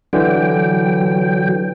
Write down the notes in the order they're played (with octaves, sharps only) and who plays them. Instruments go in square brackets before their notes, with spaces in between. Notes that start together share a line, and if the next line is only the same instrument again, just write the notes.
[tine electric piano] D3 E3 [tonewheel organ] F#3 G5